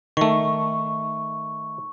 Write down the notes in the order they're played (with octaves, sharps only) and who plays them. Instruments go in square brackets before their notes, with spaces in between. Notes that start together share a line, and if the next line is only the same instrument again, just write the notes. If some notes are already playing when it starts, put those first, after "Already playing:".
[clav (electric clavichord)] D#3 A3 [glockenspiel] C#6